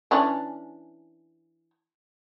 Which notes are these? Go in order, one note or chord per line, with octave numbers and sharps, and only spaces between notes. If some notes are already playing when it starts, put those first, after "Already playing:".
E3 C#4 D4